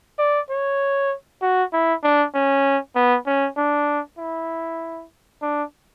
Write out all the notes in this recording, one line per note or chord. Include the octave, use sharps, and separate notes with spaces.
D5
C#5
F#4
E4
D4
C#4
B3
C#4
D4
E4
D4